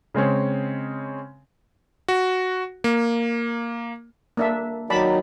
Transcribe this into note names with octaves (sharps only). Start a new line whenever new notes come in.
C#3 G#3 C4 C#4
F#4
A#3
A#3 D4 E5
D#3 F#3 D5 A5 B5